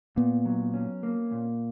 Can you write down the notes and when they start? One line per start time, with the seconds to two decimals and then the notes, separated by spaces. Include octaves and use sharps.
0.16 A#2 B3
0.45 F#3
0.74 C#4
1.03 A#3
1.32 A#2